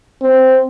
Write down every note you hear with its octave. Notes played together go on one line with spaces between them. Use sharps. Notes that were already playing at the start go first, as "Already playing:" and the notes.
C4